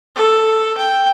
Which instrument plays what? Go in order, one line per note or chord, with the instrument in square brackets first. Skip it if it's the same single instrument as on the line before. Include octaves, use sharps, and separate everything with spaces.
[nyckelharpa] A4
G5